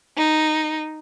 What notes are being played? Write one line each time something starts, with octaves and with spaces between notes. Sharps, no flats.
D#4